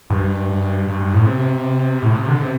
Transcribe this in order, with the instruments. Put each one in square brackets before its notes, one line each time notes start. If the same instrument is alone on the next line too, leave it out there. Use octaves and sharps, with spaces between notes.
[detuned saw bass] G2
G2
G2
G2
A2
C3
A2
C3
D3
C3